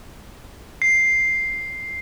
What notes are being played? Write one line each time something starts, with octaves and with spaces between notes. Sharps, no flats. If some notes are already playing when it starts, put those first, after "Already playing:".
C7